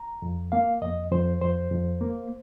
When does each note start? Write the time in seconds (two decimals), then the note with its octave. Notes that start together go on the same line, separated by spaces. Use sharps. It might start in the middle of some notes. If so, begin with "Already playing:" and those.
Already playing: A#5
0.22 F2
0.52 A#3 F5
0.82 F2 D#5
1.12 F2 C5
1.42 F2 C5
1.71 F2
2.01 A#3